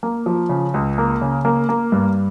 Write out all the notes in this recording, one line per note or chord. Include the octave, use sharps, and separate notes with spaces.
A#3
F3
C#3
C#2
A#3
C#3
A#3
A#3
G2